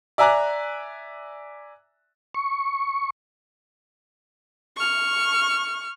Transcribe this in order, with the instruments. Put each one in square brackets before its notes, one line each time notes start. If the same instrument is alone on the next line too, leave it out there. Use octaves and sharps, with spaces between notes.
[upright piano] D5 E5 G#5 A#5 D6 F#6
[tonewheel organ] C#6
[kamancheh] C#6 F6